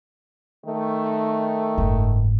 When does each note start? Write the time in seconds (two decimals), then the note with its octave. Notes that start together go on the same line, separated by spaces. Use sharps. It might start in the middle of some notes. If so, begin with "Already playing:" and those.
0.64 D#3 A3
1.78 F#1 G#2